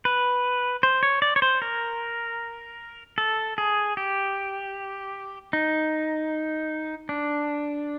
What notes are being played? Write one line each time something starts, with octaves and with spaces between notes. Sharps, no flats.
B4
C5
C#5
D5
C#5
C5
A#4
A4
G#4
G4
D#4
D4